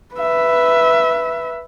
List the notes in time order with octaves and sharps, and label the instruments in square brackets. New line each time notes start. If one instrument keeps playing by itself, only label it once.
[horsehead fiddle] B4 E5